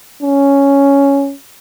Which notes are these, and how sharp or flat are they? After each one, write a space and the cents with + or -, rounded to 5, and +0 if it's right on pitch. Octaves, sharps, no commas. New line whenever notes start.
C#4 +5